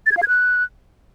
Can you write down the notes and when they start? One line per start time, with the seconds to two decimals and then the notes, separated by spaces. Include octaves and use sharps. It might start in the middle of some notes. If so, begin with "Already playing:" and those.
0.06 A6
0.12 G#6
0.17 F5
0.23 G#6
0.28 F#6